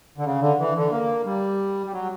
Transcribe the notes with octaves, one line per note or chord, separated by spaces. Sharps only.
D3
C#3
D3
E3
D3
A#3
G3
G3
F#3